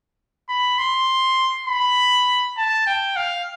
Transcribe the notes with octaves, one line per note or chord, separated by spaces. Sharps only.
B5
C6
B5
A5
G5
F5